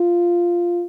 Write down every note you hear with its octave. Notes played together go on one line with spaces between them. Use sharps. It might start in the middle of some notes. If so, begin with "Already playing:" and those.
Already playing: F4